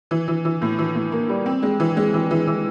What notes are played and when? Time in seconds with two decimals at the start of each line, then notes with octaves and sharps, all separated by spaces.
0.11 E3
0.28 E3
0.45 E3
0.62 A2
0.79 E3
0.95 A2
1.12 A#3
1.29 G3
1.46 C4
1.63 G#3
1.80 E3
1.97 G#3
2.14 E3
2.31 E3
2.47 E3